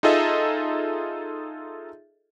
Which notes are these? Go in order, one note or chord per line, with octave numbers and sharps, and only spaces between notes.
D#4 F4 G#4 A4 D#5 E5